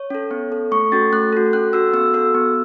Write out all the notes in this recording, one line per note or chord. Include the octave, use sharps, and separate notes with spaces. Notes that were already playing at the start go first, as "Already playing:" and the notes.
Already playing: C#5
C#4 A4
B3
A4
A3 C#6
C#4 F#4 A4 A6
A3 F#6
F#4 A4
C#4 F#6
F#4 A4 E6
B3 E6
F#4 A4 E6
B3